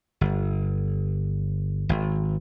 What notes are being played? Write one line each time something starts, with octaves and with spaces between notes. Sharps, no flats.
G1
G#1